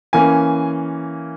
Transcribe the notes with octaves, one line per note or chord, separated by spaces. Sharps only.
E3 A#3 C#4 G#5